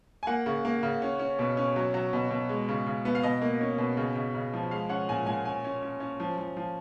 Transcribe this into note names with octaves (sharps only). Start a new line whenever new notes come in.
G#5
A#3 F#5
C#3
A#3
C#3
C#4
C#4
B2
C#4
F#3
F#3
B2
B2
G#3
C#3
C#3
B3
F5
B2 D#5
A#3
C#4
B2
C#3
C#3
C#3
F3
G#3 F5
C#4 F#5
A#2 G#5
A#2 G#5
C#4 G#5
C#4
C#4
C#4
F3
F3
F3